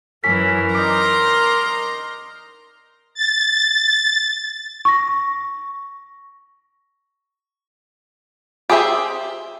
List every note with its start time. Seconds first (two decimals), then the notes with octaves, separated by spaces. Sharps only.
0.24 F#2 E3 C#4 A#4 B6
0.74 D#4 D5 A#5 C6 D6
3.14 A6
4.85 C#6 A#6
8.70 G4 G#4 C5 E5